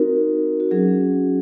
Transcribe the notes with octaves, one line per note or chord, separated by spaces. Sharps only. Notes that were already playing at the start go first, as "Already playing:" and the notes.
Already playing: C4 D#4 F#4 A#4
F#4
F#3 C#4 F#4 G#4